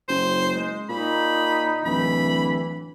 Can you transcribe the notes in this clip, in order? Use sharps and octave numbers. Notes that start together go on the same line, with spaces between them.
F#1 C5
G#3
A#2 D#4 B5
D1 E3 B5